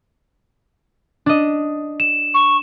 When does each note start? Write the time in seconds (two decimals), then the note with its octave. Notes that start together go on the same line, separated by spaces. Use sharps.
1.26 D4 D#5
2.00 E7
2.34 C#6